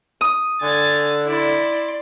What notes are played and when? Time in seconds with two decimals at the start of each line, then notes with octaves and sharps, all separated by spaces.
0.21 D#6
0.62 D3 G#5 A6
1.27 E4 D5 C6